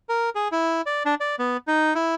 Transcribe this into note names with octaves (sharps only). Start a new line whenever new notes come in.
A#4
G#4
E4
D5
D4
D5
B3
D#4
E4